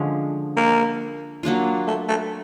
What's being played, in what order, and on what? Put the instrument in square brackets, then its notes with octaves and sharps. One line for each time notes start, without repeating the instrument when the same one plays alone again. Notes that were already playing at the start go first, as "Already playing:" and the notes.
Already playing: [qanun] D3 F3 G#3 C#4
[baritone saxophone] A#3
[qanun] F#3 A#3 D4 F4
[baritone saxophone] A3
A3